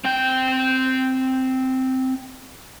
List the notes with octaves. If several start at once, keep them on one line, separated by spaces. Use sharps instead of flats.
C4 G5